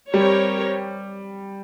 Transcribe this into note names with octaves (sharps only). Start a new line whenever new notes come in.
G3 C4 G4 A#4 C#5